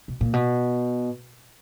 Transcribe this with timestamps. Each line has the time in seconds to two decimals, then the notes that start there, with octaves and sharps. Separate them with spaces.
0.08 B2
0.21 A#2
0.33 B2